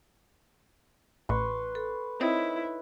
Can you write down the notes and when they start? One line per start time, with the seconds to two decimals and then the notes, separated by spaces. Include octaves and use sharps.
1.29 A1 B4 C6 C#6
1.75 A4
2.21 C4 D#4 E4 C#5 D#5